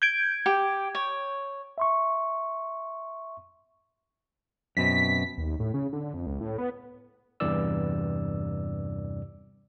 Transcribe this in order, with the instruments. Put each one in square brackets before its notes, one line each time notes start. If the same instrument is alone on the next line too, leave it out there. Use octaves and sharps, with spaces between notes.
[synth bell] G6 G#6 D7
[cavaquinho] G4
C#5
[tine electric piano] E5 C6 C#6
[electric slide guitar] F#2 B2 C4 [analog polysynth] B6
[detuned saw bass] D#2
A2
C#3
D3
F2
C#2
A2
B3
[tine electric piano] E2 G2 C3 E3 D5 E6